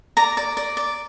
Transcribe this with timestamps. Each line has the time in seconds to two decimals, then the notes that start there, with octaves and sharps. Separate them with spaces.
0.17 D5 A#5
0.37 D5
0.57 D5
0.77 D5